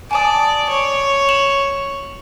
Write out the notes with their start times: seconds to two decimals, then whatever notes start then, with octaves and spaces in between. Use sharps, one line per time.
0.11 D5 G#5 A5 D#6
0.70 C#5
1.29 E7 F#7